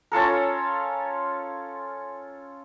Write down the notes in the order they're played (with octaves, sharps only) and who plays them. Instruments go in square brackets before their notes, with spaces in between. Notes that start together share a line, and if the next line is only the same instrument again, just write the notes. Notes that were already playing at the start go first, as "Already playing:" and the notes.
[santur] C#4 F4 A4 A#4